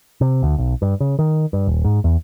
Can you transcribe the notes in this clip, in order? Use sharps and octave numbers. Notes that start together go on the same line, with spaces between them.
C3
D2
B1
G2
C#3
D#3
G2
D#1
G#2
E2